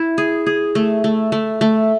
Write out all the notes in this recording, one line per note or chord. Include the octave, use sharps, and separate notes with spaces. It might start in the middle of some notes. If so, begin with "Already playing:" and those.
Already playing: E4
G#4
G#4
A3
A3
A3
A3